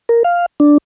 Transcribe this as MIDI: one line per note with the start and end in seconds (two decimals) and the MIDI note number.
0.09 0.23 70
0.24 0.46 77
0.60 0.78 62